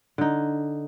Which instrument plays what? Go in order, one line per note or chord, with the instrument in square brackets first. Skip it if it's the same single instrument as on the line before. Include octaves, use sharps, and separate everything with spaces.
[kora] D3 D#4